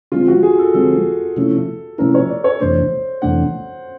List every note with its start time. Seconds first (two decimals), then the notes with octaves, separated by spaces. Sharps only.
0.12 D3 F3 G#3 C4 F4
0.28 F#4
0.43 G#4
0.59 A4
0.74 D3 F3 G#3 C4 A4
1.36 C3 F3 A3 C#4 E4
1.98 C3 F3 A3 C#4 E4 A#4
2.14 C#5
2.29 D5
2.44 C#5
2.60 F2 C3 E3 A3 D4 C5
3.22 F2 C3 E3 A3 D4 F#5